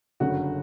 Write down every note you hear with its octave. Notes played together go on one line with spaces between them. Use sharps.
G1 F#2 C#3 F#3 A3 F#4